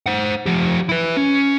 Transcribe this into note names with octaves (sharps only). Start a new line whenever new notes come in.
C5 F#5
F3 G4
E4 B4
C#4